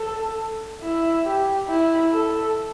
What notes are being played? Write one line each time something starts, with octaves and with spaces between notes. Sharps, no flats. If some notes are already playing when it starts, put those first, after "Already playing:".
Already playing: A4
E4
G4
E4
A4